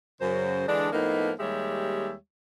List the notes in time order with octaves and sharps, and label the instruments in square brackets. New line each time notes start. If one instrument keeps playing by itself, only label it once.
[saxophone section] F#2 C#3 C5
D3 E3 G#3 D4
A2 F3 A#3 B3 D#4
D#2 G3 G#3 G4 C#5 E5